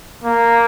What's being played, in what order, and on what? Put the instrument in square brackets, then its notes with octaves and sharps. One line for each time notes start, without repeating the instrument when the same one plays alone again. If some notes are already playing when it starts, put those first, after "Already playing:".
[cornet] A#3